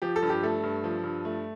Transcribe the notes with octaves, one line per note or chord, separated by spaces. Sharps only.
F3 G4
A4
G2
G4
A3 A4
G2
F3
G2
A3